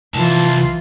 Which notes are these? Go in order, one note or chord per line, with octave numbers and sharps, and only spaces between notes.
C2 E3 F4 A5